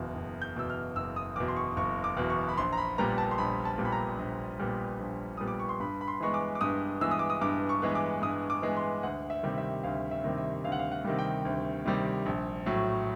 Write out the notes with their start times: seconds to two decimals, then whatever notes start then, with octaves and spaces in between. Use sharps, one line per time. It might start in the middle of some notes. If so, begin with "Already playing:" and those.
Already playing: F#1 E2 B2
0.15 F#1
0.42 G6
0.56 E2 B2 E6
0.70 F6
0.96 F#1 E6
1.16 D#6
1.36 E2 B2 D6
1.48 C6
1.56 C#6
1.76 F#1 C#6
2.04 D6
2.17 E2 B2
2.30 C#6
2.49 B5
2.58 A#1 C6
2.73 A#5
2.77 B5
2.98 A#2 G3 B3 A#5
3.18 A5
3.31 C6
3.38 A#1 B5
3.65 A5
3.78 A#2 G3 B3
3.85 B5
3.92 A#5
4.18 A#1
4.59 A#2 G3 B3
4.99 A#1
5.37 A#2 G3 B3 D#6
5.48 D6
5.59 C#6
5.69 C6
5.80 G2 B5
6.01 B5
6.08 C6
6.21 E3 G#3 B3 C#6
6.34 D6
6.55 D6
6.61 G2 D#6
7.01 E3 G#3 B3 E6
7.11 D#6
7.19 D6
7.30 D#6
7.41 G2 D6
7.69 C#6
7.82 E3 G#3 B3
7.95 D6
8.22 G2 D#6
8.50 D6
8.62 E3 G#3 B3
8.77 C6
9.03 D2 F#5
9.30 E5
9.43 C3 D#3 G3
9.58 E5
9.83 D2 F5
10.11 E5
10.24 C3 D#3 G3
10.38 E5
10.64 D2 F5
10.72 F#5
10.79 F5
10.92 F#5
11.04 C3 D#3 G3
11.19 G5
11.45 D2
11.86 C3 D#3 G3
12.26 A#1
12.66 A2 F#3